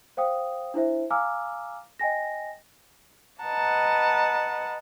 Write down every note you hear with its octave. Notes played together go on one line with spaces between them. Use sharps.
C5 F5 G5 D#6
D4 E4 C5 E5
F5 G#5 A#5 D6 E6 F6
D#5 G5 G#5 A#6
B4 D#5 F#5 A5 A#5